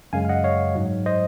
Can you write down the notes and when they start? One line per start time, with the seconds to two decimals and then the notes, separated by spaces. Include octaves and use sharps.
0.13 F#2 C#3 G#3 F5 G#5
0.25 F5
0.29 D#5 F#5
0.44 C#5 F5
0.75 G#2 F#3
1.06 C5 D#5